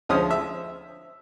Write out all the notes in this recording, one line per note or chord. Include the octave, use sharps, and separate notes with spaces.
D2 F3 G#3 C#4 F4 D#6
E5